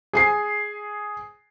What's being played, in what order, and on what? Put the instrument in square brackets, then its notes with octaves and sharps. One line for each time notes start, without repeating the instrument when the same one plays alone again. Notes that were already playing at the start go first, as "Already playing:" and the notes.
[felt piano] G#4 G#5 C7